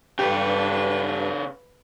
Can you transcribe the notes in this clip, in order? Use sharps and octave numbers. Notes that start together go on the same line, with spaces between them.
G2 C#3 G4 A4 B4